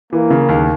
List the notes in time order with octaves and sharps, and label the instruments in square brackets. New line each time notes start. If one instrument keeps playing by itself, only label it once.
[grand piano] E3 [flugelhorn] A#3
[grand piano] C#3
D#2